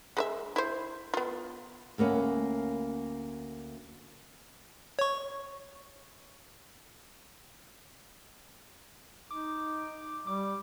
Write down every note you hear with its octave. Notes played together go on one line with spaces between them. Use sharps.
G#3 B4 E5
E4 C5
B3 F4
D2 A#3 B3 C#4
C#5 C#6
D#4 D6
G3 D6